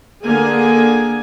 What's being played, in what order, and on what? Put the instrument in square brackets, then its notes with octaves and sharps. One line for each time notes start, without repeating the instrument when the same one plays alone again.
[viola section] D3 A#3 G#4 G#5